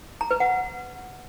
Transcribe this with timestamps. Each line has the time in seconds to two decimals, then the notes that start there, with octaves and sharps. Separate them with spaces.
0.21 A#5
0.31 B4
0.40 F#5